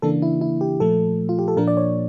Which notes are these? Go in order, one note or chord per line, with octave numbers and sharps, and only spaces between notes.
C#3 E3 A#3 D4 A4
E4
E4
G4
A#2 F3 A3 A4
F4
G4
A4
A#2 F3 A#3 D4 A#4
D5
C#5